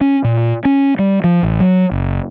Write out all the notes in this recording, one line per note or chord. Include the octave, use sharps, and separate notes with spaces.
C#4
A#2
C#4
G3
F3
A1
F#3
F#1